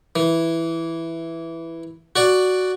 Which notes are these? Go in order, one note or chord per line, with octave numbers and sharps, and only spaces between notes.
E3
F#4 D5